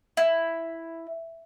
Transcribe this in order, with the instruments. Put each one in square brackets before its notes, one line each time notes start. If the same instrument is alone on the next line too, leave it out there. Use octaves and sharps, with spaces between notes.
[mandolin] E4